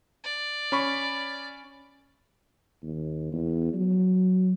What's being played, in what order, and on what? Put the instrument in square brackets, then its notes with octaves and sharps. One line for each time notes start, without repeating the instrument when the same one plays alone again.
[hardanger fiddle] D5
[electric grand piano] C#4 B5 C#6
[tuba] D#2
E2
F#3